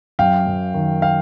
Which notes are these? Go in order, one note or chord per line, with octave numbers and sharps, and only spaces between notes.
F#2 F5 G5
F#2
D#3
F5 G5